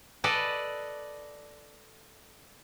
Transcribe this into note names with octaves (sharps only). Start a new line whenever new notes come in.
A4 B4 D5 D#5